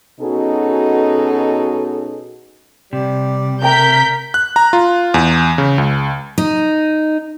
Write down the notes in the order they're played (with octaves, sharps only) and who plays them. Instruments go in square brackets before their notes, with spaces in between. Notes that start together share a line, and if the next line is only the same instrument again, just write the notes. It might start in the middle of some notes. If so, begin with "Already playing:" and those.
[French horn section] B2 C#4 D#4 F#4 G#4 A4
[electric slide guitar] C3 [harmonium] G3 G4 D5
[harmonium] A3 [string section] A#4 G6 B6 [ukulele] D5 G5 A#5
[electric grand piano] F#6
A#5
F4
E2
C#3
C#2
[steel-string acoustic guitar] D#4